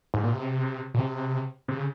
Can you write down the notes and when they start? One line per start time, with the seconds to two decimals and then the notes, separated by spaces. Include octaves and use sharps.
0.14 G#2
0.24 A#2
0.33 C3
0.94 A#2
0.98 C3
1.68 C3
1.78 C#3